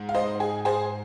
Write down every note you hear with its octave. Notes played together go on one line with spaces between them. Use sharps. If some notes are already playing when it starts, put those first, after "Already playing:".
Already playing: G#2
F5
C5 D#5
G#4
G#4 C5